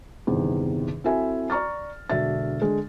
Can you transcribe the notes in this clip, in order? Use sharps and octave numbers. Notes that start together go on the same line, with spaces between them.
G1 E2 C3 D#3
C4 E4 F#4 A4 E5 G#5
D5 A#5 C#6 F6 A6
E1 D3 D4 F#4 E5 A6
D3 G#3